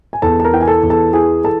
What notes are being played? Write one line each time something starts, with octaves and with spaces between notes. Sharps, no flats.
G#5
E2 A4 A5
A5
A#4 A#5
E3 G5
G#5
A4 A5
E2
A4 A5
E3 G#4 G#5
A4 A5